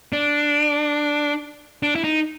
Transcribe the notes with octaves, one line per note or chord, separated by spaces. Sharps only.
D4
D4
E4
D#4